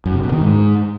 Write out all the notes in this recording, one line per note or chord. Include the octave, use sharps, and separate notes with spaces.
F#2
C3
B2
D#3
G#2